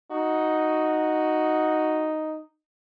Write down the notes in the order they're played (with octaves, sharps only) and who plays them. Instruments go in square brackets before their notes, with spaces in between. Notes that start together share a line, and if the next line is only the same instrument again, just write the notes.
[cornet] D#4 [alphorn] F#4